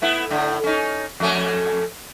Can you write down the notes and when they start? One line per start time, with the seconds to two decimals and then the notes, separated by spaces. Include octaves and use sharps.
0.02 A3 B3 E4
0.30 A2 D3
0.64 C#4 D#4
1.20 F2 A3 C#4